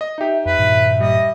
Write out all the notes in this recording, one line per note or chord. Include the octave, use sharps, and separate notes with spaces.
D#5
D#4 G4 E5
F2 B4 E5
G2 A#2 D#3
G3 D#5